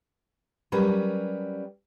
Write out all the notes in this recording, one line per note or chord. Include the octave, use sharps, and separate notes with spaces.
F#3 G3 C#4 A#4 B4